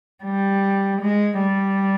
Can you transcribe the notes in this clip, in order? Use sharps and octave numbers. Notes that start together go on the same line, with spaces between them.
G3
G#3
G3